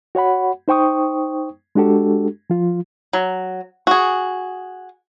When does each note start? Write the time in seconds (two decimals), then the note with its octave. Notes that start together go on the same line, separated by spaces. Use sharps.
0.15 F#4 C#5 F#5 B5
0.68 D#4 C5 G5 C#6 D#6
1.75 G#3 D4 F#4 G4 A4
2.50 F3 F4
3.13 F#3
3.87 F#4 G#4